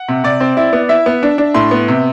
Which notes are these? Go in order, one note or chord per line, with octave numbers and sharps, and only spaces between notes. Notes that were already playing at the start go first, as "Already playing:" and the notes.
Already playing: F#5
C3
C3 D5
C4
E4
B3
E4 E5
B3
D4
D4
A2 C6
B3
C3